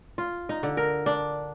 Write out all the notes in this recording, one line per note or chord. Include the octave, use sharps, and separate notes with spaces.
F4
D#4
D3
A#4
D4